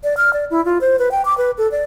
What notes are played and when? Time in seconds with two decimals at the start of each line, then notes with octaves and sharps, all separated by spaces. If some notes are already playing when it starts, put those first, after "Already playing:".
0.04 D5
0.17 F6
0.33 D5
0.50 E4
0.65 F4
0.81 C5
0.99 B4
1.11 G5
1.25 D6
1.37 B4
1.58 A4
1.71 D5